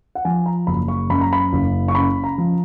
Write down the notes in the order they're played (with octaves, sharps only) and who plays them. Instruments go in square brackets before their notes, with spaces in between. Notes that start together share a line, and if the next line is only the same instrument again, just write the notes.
[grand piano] F#5
F3 G#5
A#5
F#1 B5
C#6
F#2 B5
A#5
B5
F#1
C#6
C#3 B5
A#5
F3